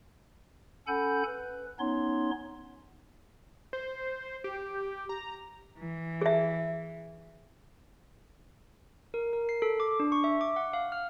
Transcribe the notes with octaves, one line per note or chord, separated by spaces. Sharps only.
C#4 A4 F#5 G#5 B5 G6
B4
B3 C#4 D#4 C#5 C6
C5
G4
A#5
E3
G#4 E5
A#4
A#4
C7
A4
D6
D4
C#6
E5
D6
F#5
F5
F6